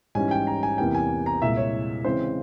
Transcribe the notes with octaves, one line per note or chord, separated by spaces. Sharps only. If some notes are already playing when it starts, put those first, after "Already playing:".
G#2 E3 G3 C#4 G#5
G5
A#5
G#5
E2 C3 E3 G3 A#3 G5
G#5
A#5
C2 A#2 G#3 E4 E5
C#5
C#3 E3 G#3 C4 C5